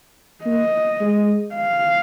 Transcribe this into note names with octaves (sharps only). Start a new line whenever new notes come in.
A#3 D#5
G#3
F5